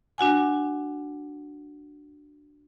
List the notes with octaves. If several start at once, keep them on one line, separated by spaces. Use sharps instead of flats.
D4 F#4 F#5 G#5